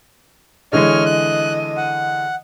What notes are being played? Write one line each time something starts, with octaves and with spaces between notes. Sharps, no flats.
D3 E3 G#3 C#5 D#5 F6
F#6
F#5